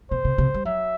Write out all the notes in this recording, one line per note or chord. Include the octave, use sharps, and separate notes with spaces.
B2 C5
C3
C3
G3
F#3 E5